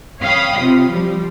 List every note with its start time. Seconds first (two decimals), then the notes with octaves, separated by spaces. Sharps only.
0.22 C#5 F5 G5 B5 D#6
0.57 C3 F4
0.90 F3 G3